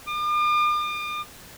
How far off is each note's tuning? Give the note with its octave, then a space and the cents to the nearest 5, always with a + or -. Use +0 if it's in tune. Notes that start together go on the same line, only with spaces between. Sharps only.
D6 +45